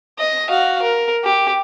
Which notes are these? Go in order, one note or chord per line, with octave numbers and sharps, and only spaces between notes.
D#5
F#4 F5
A#4
G4